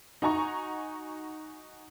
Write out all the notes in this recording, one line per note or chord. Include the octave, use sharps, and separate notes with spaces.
D#4 F#4 G#5 A#5 C#6